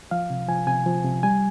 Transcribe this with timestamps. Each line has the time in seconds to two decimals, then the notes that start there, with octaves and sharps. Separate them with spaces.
0.11 F3 F5
0.30 C3
0.48 F3 G#5
0.67 C3 G#5
0.86 F3
1.04 C3
1.23 G3 G#5